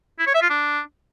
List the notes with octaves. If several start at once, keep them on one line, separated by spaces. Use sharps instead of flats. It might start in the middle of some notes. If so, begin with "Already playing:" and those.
E4
C#5
E5
F4
D4